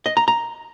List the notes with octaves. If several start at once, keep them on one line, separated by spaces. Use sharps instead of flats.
D#5
A#5
A#5